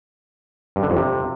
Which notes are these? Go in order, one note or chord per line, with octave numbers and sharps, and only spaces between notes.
G2
D3
F2
C3